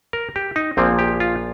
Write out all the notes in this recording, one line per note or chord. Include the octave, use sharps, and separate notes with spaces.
A#4
G4
D#4
A#1 A#2 F3 A#3 C4
G4
F4